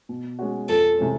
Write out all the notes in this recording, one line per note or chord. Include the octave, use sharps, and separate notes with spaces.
B2
G#3 C#4 F#4
F2 A4
C3 E3 G#3 C#4